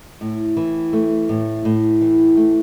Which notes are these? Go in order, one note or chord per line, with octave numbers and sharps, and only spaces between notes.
A2
E3
A3
A2
A2
E3
A3